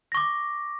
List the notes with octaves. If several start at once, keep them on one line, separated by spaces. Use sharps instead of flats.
C#6 D6 A#6